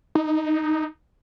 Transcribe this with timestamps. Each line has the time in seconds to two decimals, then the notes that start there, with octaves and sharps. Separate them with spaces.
0.15 D#4